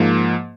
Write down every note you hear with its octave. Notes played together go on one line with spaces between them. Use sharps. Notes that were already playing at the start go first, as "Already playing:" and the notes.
Already playing: G#2 F3 A#3